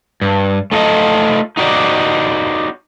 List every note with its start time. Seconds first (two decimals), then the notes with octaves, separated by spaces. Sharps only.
0.21 G2
0.72 A3 D#4 F4 A4 D#5
1.57 D#4 F#4 G4 D5